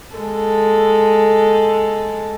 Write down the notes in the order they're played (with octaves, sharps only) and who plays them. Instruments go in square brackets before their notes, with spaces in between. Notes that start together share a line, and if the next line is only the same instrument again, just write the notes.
[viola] G#3 A4